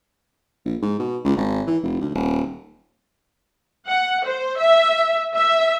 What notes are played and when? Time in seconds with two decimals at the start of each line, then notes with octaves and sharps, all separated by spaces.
0.65 A#1
0.82 G#2
0.99 B2
1.25 C#2
1.37 G#1
1.67 E3
1.83 F1
2.01 D2
2.15 D#1
3.87 F#5
4.25 C5
4.58 E5
5.34 E5